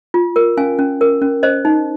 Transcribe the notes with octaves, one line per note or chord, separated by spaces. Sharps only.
F4
A#4
C#4 F5 G#5
C#4
A#4
C#4
C5 D#5
D#4